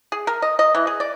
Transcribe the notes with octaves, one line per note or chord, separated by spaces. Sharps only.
G#4
A#4
D#5
D#5
E3
G#4
D5